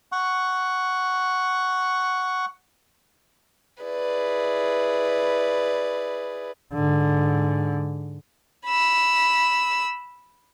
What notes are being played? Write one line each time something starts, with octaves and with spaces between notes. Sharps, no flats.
F#5 C#6
E4 G#4 B4 D5
G#2 D3
B5 E6